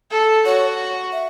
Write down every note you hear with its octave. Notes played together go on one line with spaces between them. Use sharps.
A4
F#4 C#5
E5